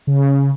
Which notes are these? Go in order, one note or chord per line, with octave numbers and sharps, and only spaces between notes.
C#3